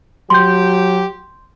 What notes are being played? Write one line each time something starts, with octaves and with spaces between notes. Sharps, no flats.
F#3 G4 C6 G6